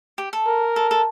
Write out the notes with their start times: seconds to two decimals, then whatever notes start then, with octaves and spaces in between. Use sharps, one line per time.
0.18 G4
0.33 A4
0.47 A#4
0.76 A4
0.91 A4